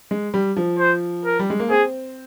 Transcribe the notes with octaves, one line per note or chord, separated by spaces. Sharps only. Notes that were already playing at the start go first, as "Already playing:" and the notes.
G#3
G3
F3
C5
A#4
G3
G#3
A#3
C4 G#4